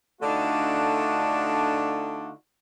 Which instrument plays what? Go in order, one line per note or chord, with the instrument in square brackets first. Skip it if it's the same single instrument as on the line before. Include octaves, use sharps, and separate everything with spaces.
[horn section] D3 A3 D4 D#4 F4 F#4